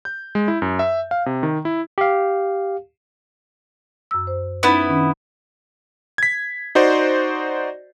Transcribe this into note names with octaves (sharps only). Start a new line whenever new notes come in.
G6
G#3
E4
F#2
E5
F5
C3
D#3
E4
G4 F5
F#2 E6
C5
B3 C#4 D#4 E4
D#3 C#4 D4
G#6 B6
D#4 F#4 C5 D5